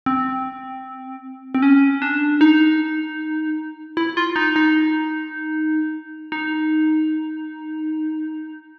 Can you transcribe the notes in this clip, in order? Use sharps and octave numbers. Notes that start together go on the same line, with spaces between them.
C4
C4
C#4
D4
D#4
E4
F4
D#4
D#4
D#4